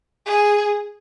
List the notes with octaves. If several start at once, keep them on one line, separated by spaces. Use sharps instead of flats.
G#4